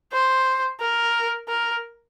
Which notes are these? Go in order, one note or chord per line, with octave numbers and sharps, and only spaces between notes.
C5
A#4
A#4